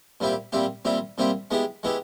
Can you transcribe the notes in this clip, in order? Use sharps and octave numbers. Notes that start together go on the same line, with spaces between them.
A#2 G3 C4 E4 G4
A#2 G3 C4 E4 G4
A#2 G3 C4 E4 G4
A#2 G3 C4 E4 G4
G#3 B3 E4 G4
G#3 B3 E4 G4